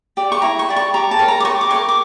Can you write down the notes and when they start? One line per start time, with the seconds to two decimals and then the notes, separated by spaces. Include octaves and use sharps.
0.17 G4 D5
0.32 C#6
0.42 E4 A#5
0.59 C#6
0.69 G4 D5
0.76 C#6
0.94 G4 A#5
1.11 A5
1.19 A#4 C#5
1.28 A#5
1.40 D6
1.45 G4 C#6
1.61 D6
1.71 C#5 C#6
1.76 A#4
1.89 D6